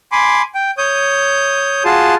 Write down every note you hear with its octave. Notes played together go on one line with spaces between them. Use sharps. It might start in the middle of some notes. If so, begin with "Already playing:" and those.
G#5 B5 C6 D6
G5
C#5 D#6 G6
F4 F#4 G#4 A5 C6